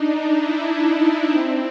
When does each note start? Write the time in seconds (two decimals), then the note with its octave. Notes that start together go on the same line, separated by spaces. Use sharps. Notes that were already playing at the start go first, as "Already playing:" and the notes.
Already playing: D4 D#4
0.34 E4
1.29 C4